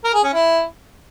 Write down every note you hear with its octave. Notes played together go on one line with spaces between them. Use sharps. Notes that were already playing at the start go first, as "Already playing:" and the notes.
A#4
G#4
C#4
E4